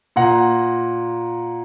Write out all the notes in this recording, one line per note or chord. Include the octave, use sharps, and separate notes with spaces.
A#2 F#5 A#5